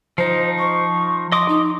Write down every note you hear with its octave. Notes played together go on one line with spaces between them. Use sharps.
F3 D#4 C5
C#6
D#5 C6 D6 D#6
D#4